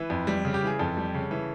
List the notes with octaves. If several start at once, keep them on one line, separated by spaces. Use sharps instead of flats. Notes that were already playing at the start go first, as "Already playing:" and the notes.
Already playing: E3 B4
F2
G3
C#3
G4
E3 G#4
F2 A4
G3
C#3
E3